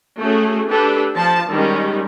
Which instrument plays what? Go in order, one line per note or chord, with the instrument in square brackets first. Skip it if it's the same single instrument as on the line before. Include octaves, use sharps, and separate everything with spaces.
[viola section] A3 C#4 F#4 G#4
D4 G4 A4 B4
F3 A5
D#3 G3 G#3 C#4